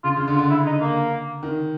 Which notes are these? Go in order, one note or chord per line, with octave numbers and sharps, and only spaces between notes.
C#3 F4
C#3
F4
D3
F4
D3
E4
D#4
A#3
D#3